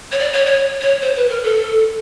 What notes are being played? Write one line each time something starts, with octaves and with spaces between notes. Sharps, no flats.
C#5
D5
C#5
C#5
C#5
C5
B4
A#4
A4